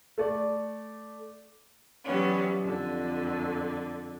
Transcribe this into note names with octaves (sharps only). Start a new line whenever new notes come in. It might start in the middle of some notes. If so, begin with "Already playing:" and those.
A3 D5
E3 F#3 G3 B3 C#4
F2 D3